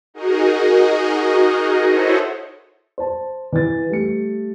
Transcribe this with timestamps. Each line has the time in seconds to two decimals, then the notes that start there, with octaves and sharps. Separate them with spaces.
0.14 D#4 F#4 G#4 A#4 D#5
1.88 E4 F#4 A4 C5 C#5 D#5
2.98 C5 A5
3.53 E3 B4 A6
3.89 G3 A3 C#7